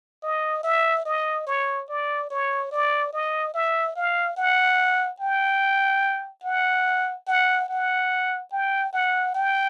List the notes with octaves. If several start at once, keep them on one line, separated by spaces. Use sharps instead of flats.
D#5
E5
D#5
C#5
D5
C#5
D5
D#5
E5
F5
F#5
G5
F#5
F#5
F#5
G5
F#5
G5